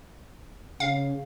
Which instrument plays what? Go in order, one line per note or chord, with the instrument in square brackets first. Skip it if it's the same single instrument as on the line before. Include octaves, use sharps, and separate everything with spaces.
[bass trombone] C#3 [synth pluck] F5